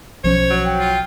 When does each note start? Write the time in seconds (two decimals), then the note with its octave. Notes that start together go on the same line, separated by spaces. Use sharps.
0.24 B1 F3 C#4 C5 C#5
0.50 F#3
0.65 G5
0.80 F4